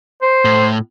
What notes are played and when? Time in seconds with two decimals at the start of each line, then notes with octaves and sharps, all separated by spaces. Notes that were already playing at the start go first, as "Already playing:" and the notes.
0.22 C5
0.45 A2